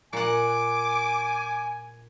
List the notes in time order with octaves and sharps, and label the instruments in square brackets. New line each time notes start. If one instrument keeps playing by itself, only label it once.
[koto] A#2 F#5 [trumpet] G#5 [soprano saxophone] D6